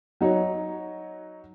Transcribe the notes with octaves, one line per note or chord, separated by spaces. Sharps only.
F#3 D#4 F#4 C#5